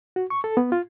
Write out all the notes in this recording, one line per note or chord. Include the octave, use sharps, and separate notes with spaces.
F#4
C#6
A4
B3
F4